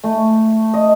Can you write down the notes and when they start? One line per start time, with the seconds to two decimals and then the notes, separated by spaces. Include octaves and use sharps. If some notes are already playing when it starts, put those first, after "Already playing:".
0.04 A3
0.74 D#5